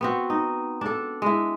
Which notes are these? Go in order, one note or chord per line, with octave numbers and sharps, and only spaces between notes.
B3 C4 F#4
D#4
D4 A4
G#3 E4